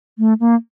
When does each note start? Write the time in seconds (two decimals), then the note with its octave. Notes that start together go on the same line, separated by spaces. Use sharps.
0.19 A3
0.40 A#3